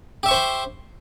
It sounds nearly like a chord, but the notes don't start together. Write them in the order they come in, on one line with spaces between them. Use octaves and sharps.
G4 E5 C#6 C5 C6